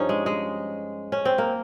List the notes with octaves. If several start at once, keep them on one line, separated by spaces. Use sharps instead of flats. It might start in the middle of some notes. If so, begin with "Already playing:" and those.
Already playing: G2 F3 C#4 D#4
G#3
G#3
C#4
C4
A#3